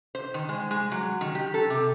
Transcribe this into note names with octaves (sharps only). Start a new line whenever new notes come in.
C5
D#3
G#3
G#3
F#3
D#3
G4
A4
C3